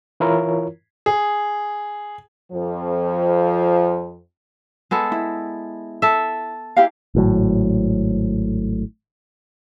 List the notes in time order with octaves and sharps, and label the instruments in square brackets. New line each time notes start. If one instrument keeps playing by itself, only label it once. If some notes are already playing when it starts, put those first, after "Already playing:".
[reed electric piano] E3 E4 F4 A#4 C#5
[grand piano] G#4
[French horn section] F2 F3
[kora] G#3 B3 A4
[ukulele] E4
[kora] A4 E5
[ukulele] E4 G4 F5
[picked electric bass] G#1 A2 F#3